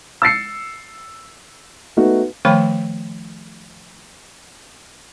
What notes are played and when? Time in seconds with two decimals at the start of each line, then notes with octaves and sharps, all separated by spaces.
0.22 E6 A6 C7 C#7
1.97 A3 B3 D#4 F#4
2.45 D#3 F3 A3 C#5 G5 B5